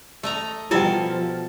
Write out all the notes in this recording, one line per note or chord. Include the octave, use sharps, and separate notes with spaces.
A3 D#5 A#5
B2 F3 G3 E4 A4 G5 G#5